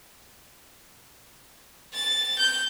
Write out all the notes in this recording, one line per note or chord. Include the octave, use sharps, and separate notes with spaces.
A6
G6